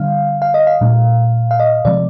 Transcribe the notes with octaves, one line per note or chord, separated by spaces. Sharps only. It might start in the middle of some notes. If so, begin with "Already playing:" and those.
Already playing: D3 G3 D4 F5
F5
D#5
F5
A#2 G#3 D4
F5
D#5
C3 F3 G#3 C4 D5